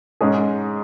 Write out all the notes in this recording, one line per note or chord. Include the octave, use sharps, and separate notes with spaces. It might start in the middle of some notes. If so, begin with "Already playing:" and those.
G#2 G#3 C#4 G#4